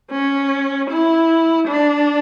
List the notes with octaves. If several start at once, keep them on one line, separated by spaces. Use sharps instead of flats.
C#4
E4
D4